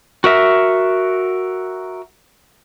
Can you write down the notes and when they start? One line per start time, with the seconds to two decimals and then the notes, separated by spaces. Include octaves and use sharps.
0.24 F#4 A#4 E5